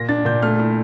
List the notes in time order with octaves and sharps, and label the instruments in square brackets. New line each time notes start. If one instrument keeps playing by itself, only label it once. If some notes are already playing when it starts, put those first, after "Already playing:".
Already playing: [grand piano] A#2 A#6
D4 A6
A#2 G6
A3 F6
E4